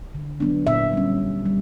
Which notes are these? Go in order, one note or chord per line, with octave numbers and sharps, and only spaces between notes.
D3
F#3 B3 D4
A#2 E5
G3 C#4
A#2
G3